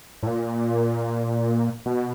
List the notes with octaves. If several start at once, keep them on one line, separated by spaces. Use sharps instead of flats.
A2
A#2
B2